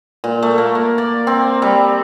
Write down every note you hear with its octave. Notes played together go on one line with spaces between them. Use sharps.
A#2
A3
A#3
A#3
D5
C4
G3